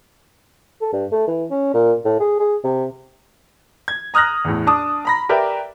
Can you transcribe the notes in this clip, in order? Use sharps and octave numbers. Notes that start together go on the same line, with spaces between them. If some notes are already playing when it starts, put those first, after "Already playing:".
A4
G2
A3
E3
C#4
A#2
A2
G#4
G#4
C3
G#6
A#5 D#6 F6 F#6 A#6
E2 A2
D4 A5 D6 D#6
A#5 B5 A#6
G4 A#4 B4 D5 E5 G5